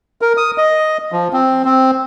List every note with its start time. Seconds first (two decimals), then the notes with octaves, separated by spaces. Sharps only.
0.21 A#4
0.37 D#6
0.58 D#5
1.12 F3
1.33 C4
1.65 C4